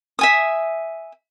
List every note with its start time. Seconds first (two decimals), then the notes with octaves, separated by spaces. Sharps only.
0.19 E5 G#5 D#6